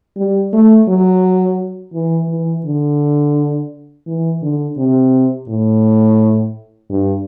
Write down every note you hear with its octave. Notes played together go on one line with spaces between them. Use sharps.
G3
A3
F#3
E3
E3
D3
E3
D3
C3
A2
G2